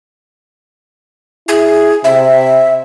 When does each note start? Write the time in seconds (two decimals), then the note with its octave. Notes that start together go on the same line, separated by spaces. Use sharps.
1.48 E4 G#4
2.04 C3 E5